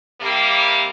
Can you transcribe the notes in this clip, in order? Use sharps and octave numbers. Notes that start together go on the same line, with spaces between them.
C3 G3 A#3